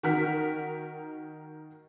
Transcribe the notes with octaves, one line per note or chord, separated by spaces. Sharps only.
D#3 F#4 A#4 F6 B6